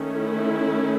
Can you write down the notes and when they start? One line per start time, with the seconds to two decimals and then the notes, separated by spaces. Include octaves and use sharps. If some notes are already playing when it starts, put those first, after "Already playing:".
Already playing: D#3 A3 C#4
0.13 E4